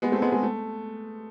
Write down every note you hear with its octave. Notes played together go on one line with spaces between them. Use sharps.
G#3 B3
A3 C4
G#3 B3
G#3
A3